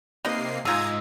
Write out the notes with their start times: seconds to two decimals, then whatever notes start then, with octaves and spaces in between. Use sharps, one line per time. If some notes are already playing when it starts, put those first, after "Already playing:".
0.25 C3 A#3 D#4 B4 D#5 C7
0.65 G#2 D#4 F4 G#4 A#5 D#6 E6 G#6